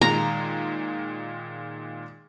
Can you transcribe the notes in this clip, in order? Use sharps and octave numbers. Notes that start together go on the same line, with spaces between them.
A#2 D#3 G#3 A#5